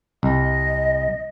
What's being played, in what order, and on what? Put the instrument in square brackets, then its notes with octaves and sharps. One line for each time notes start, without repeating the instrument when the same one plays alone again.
[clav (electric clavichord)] C2 [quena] D#5